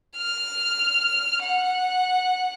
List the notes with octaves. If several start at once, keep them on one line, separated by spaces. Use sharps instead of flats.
F6
F#5